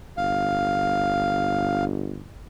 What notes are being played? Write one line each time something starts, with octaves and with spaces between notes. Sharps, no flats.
G1 F5